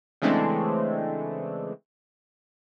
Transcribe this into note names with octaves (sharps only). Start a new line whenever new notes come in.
C#3 E3 G#3 A3 C4 D4